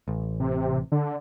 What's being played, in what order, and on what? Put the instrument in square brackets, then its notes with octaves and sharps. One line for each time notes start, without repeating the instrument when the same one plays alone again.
[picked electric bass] A1
[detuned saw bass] C3
D3